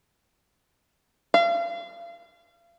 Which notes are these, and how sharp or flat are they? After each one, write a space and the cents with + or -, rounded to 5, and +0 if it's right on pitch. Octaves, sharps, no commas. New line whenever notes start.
F5 -35